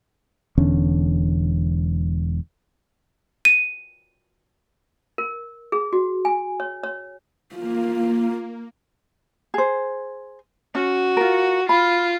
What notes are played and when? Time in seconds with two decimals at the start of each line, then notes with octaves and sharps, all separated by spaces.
0.58 E1 E2 D3 C#4
3.45 D#7
5.18 A#4
5.72 G#4
5.93 F#4
6.25 G#5
6.60 C#5
6.84 C#5
7.55 A#3 F4
9.54 G#4 C5
10.75 C#4 F#4
11.17 F4 A#4
11.69 F4 B5